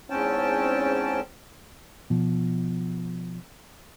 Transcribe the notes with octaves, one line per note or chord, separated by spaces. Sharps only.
E2 G#2 C4 C#4 G5 A5
B2 F3